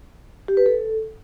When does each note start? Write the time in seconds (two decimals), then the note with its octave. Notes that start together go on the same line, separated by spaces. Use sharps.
0.48 G4
0.57 B4
0.66 A4